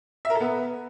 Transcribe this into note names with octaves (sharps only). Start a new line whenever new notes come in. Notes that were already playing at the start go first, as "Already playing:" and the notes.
E5
A#4
A4
B3